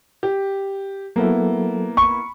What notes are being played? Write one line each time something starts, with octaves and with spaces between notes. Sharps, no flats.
G4
F#3 A#3 B3 E4 A4
B5 C#6